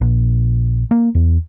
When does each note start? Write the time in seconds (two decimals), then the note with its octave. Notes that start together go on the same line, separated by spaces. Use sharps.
0.01 A#1
0.91 A#3
1.15 E2